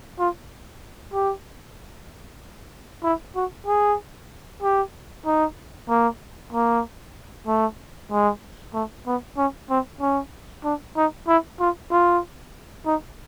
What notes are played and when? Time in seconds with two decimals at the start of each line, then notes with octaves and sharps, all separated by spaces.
0.19 F4
1.13 G4
3.04 E4
3.35 F#4
3.67 G#4
4.62 G4
5.26 D#4
5.89 A#3
6.53 A#3
7.47 A3
8.11 G#3
8.74 A3
9.06 B3
9.37 C#4
9.70 C4
10.01 C#4
10.64 D4
10.97 D#4
11.28 E4
11.60 F4
11.91 F4
12.86 D#4